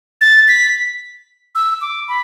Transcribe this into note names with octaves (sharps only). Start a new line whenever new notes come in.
A6
B6
E6
D6
B5